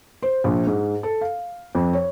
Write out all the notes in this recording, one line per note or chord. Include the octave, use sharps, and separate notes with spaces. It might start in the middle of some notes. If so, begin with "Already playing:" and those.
C5
A#1
G#2
A4
F5
F2
C#5